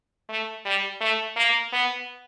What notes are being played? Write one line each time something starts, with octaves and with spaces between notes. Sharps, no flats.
A3
G3
A3
A#3
B3